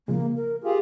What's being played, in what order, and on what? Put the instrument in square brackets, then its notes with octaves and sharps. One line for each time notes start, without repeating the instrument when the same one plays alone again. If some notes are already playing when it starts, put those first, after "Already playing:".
[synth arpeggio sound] C#3 F3 G#3 [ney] A#3
[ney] A#4
[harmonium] F4 G4 G#4 [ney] F5